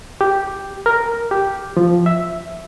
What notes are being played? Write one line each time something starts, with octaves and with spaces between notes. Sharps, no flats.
G4
A#4
G4
F3
E5